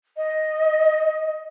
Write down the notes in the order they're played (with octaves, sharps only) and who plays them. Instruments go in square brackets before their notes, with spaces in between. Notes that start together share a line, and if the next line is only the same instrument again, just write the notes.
[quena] D#5